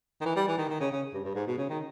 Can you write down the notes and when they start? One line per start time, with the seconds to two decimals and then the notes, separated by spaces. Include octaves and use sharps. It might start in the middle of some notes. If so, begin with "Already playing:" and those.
0.21 D#3
0.26 E3
0.36 G3
0.48 E3
0.58 D#3
0.69 D#3
0.80 C#3
0.92 C#3
1.13 G2
1.25 G2
1.35 G#2
1.47 B2
1.58 C#3
1.69 D#3